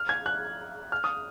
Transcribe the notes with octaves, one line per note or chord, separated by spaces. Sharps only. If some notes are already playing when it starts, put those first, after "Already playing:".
Already playing: F6
G#6
F#6
F6
D#6